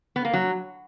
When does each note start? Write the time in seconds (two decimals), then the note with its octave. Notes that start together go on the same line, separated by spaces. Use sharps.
0.16 B3
0.25 A#3
0.33 F#3